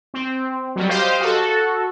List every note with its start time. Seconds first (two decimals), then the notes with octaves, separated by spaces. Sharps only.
0.14 C4
0.76 F#3 G3
0.89 G4 C5 D#5 F5
1.21 F#4 A4